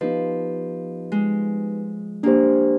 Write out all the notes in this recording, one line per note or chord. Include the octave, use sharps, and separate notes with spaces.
F3 B3 D#4 G4 B4 D#5
G#3
A#3 D4 G4 C5